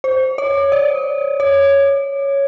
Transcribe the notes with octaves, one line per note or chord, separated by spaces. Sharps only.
C5
C#5
D5
C#5